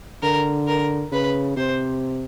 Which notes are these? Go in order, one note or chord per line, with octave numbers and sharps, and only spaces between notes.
D3 A#4
A#4
C#3 B4
C3 C5